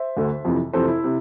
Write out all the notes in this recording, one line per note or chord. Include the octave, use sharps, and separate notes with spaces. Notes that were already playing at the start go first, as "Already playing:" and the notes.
Already playing: C5 E5
D2 D3
F2 C3 E3
F2 C3 E3 A4 C5
E4
C3